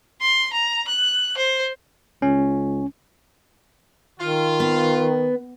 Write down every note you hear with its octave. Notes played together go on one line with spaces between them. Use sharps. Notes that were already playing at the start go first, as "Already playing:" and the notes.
C6
A#5
F#6
C5
C#2 C#4
D#3 F4
B3